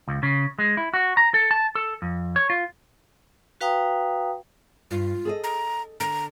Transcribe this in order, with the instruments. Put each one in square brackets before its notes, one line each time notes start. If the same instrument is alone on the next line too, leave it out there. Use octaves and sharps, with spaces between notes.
[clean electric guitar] C#2
C#3
G#3
E4
F#4
A#5
A4
A5
A4
F2
C#5
F4
[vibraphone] F#4 B4 F5 G5 A#5 D#6
[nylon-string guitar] G2 [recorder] F4
[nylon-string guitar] G#4 A4 D#5
[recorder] A#5
[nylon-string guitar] D3 [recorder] A#5